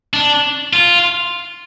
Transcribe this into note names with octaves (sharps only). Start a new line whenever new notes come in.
D4
F4